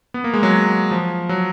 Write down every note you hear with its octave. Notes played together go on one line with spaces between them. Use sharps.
B3
A#3
G#3
F#3
F3
F#3